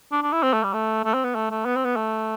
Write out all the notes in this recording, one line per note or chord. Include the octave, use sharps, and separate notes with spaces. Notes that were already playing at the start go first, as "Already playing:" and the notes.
D4
D4
E4
C4
A3
G3
A3
A3
C4
B3
A3
A3
B3
C4
B3
A3